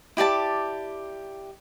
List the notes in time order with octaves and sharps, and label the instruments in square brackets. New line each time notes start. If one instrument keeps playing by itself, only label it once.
[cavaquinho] E4 G4 D5 A5